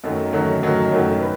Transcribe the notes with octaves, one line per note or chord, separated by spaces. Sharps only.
F#2 D#3 F#3 A3
F#2 D#3 F#3 A3
F#2 D#3 F#3 A3
F#2 D#3 F#3 A3
B4